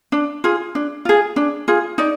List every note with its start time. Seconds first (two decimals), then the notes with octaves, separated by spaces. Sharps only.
0.12 D4
0.44 F4 G#4
0.75 D4
1.05 F4 G#4
1.36 D4
1.68 F4 G#4
1.98 D#4 D5